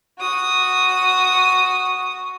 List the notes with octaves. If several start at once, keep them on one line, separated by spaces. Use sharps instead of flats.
F#4 D#6